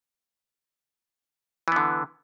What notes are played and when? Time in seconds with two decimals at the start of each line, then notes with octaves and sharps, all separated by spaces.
1.68 E3
1.72 B3
1.76 D3